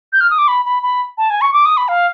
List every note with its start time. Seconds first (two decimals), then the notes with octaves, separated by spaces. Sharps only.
0.13 G6
0.21 F6
0.30 D#6
0.38 D6
0.48 B5
0.65 B5
0.83 B5
1.18 A5
1.30 G#5
1.41 C#6
1.53 D6
1.66 D#6
1.77 B5
1.88 F5